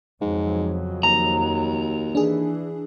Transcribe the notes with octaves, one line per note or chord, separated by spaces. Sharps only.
F2 G#2 C#3 F#3
D#2 A#5
E3 D4 G#4